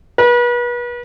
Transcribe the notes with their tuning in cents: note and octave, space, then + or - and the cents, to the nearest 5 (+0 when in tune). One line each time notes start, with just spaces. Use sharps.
B4 -35